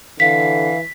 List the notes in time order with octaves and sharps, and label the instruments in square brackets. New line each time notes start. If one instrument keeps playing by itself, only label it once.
[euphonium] D3 [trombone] E3 [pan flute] F5 [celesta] B6